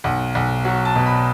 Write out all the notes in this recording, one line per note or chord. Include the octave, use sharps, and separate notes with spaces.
B1 F#5
B1 F#5
F#3 F#5
A5
B2
B5